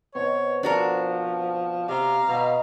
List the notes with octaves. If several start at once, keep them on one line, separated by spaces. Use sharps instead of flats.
B2 C4 C#5
F3 D4 F#4 A#4 F#5
C3 D5 F5 A#5
B2 F#4 D#5